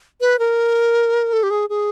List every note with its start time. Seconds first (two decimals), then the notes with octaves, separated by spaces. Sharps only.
0.21 B4
0.39 A#4
1.33 A4
1.43 G4
1.50 G#4
1.69 G#4